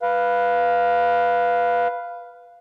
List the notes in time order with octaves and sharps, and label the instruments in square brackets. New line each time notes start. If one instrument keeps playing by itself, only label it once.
[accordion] B4 F5